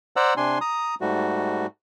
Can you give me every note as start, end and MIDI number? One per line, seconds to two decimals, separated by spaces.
0.16 0.34 72
0.16 0.34 74
0.16 0.34 78
0.16 0.34 82
0.16 0.34 88
0.37 0.58 48
0.37 0.58 62
0.37 0.58 80
0.37 0.58 84
0.61 0.95 82
0.61 0.95 87
1.01 1.66 44
1.01 1.66 55
1.01 1.66 57
1.01 1.66 66